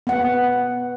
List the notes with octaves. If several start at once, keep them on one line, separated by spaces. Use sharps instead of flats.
B3 F#5